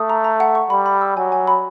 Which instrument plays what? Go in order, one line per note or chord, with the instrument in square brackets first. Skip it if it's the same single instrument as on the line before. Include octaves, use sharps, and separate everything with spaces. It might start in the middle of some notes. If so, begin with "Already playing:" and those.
Already playing: [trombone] A3 [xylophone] D#6
[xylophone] A#5
A#5
F#5
C#6
[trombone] G3 [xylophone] B5
[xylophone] B5
E6
[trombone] F#3 [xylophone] G#5
[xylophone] G#5
B5